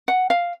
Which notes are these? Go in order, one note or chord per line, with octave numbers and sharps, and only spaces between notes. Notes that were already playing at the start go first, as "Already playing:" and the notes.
F#5
F5